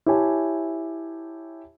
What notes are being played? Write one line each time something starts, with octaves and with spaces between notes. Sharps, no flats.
E4 G4 C#5 E5 G#5 A5